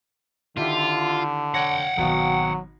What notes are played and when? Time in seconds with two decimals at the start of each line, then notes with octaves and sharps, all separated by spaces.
0.57 D3 D#3 E4 F4 G4
1.54 C#5 F#5 G5 A#6
1.98 G#1 B2 F#3 F5